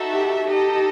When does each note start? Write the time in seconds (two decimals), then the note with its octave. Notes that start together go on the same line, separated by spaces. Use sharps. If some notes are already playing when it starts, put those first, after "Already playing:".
Already playing: D#4 F#4 A4 E5
0.11 G4
0.47 D#4 G4 A4 D#5